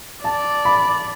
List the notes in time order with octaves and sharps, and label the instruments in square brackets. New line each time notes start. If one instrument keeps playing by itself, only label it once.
[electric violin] D5 [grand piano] A5
[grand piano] B5